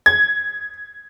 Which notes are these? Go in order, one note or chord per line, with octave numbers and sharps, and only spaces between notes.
G#6